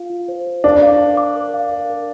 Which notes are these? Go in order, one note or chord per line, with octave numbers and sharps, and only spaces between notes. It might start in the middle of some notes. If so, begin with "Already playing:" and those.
Already playing: F4 F5
F4
C5
C5
D4 A#4
F5
A#4
D6
A#4
F5
A#4
A#4